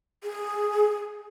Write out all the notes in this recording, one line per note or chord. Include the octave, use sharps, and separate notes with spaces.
G#4